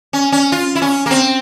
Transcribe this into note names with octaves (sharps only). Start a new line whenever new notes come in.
C#4
C#4
F4
E4
C#4
A#3
C4